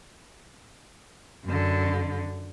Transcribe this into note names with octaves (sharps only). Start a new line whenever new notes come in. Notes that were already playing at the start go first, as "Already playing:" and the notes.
F#2 D3